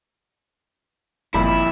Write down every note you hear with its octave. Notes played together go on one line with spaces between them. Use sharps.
G1 F2 A#2 G3 E4 B5